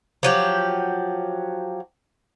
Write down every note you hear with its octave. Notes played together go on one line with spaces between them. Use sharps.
F3 F#3 G4